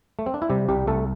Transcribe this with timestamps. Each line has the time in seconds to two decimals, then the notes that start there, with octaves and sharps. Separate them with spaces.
0.19 A3
0.26 C4
0.34 D4
0.42 E4
0.49 C3 G3 G4
0.69 C2 G3 G4
0.87 C2 A3 A4